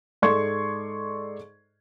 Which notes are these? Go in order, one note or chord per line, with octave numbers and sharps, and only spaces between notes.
G#2 A4 D5 C6 C#6 G#6